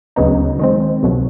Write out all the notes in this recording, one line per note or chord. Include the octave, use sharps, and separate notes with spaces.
D2 C#3 F#3 B3 D#4
D#3 G#3 C4
C2 B2 F#3